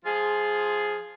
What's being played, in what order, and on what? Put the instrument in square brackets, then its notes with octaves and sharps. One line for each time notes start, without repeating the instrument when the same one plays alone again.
[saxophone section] F3 F4 G#4